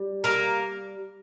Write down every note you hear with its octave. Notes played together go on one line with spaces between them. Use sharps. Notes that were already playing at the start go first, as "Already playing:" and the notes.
Already playing: G3
A#3 A#4